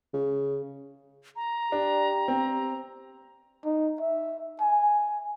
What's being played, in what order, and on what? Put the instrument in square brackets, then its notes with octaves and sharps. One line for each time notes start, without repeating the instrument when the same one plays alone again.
[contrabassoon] C#3
[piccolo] A#5
[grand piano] D4 [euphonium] G4
[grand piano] C4
[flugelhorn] D#4
E5
G#5